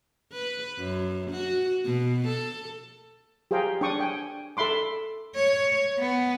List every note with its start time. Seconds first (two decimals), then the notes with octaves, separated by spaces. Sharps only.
0.33 B4
0.78 F#2
1.31 F#4
1.85 B2
2.27 A4
3.51 G4 G#4 C5 F5 G5 A#5
3.81 D4 D5 G5 C#6 D#6
4.00 G5 G#5
4.57 A4 E5 B5 C6 D6
5.35 C#5
5.99 B3